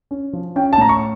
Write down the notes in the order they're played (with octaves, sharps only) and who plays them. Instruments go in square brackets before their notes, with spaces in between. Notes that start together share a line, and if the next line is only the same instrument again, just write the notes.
[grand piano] C#4
F3
C#4 G5
A5
A2 A#5
C#6